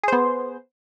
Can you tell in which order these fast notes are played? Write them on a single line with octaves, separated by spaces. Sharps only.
G#4 C5 B3